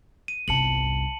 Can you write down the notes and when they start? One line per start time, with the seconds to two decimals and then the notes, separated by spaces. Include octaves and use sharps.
0.28 D#7
0.48 G1 C2 A5 C#7 F#7